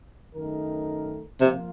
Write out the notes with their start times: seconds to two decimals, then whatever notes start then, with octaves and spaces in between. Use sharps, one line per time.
0.35 F#2 D#3 A3 D#4 A#4
1.40 C3 F3 A#3 F4